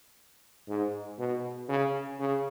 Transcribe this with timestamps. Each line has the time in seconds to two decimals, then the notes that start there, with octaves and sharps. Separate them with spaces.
0.68 G#2
1.18 B2
1.69 C#3
2.19 C#3